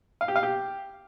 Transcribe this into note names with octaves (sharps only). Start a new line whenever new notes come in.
F5
G4
F5
G4